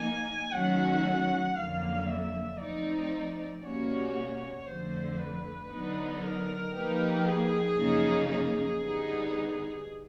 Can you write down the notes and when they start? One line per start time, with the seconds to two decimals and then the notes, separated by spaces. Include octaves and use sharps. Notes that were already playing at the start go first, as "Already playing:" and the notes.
Already playing: F3 A#3 D#4 G#5
0.52 D#3 F#3 A3 C#4 F#4 F#5
1.56 F2 D3 F#3 A#3 F5
2.07 E5
2.59 F3 A3 C4 D#4 D5
3.63 B2 G3 A#3 C#4 F#4 C#5
4.66 F2 D3 F3 A3 C5
5.19 B4
5.70 D3 F#3 B3 D#4
6.22 A#4
6.74 F3 A#3 D#4 G4 B4
7.26 G#4
7.76 F#2 C#3 F3 A#3 D#4
8.29 G#4
8.81 D3 G3 B3 D#4